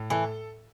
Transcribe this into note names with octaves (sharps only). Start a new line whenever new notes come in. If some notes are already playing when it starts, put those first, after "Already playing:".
Already playing: A2
E3 A4